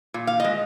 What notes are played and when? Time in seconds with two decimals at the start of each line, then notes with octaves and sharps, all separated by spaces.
0.14 A#2
0.27 F5
0.40 G#3 D#5